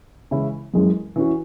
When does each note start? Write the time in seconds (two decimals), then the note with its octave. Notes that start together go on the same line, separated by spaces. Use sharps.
0.31 C#3 E3 G#3 C#4 E4
0.74 F#2 E3 G#3 C#4 G#4
1.16 E3 C#4 F#4